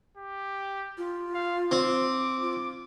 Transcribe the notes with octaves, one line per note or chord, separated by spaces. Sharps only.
G4
F4
F5
C4 D6
F4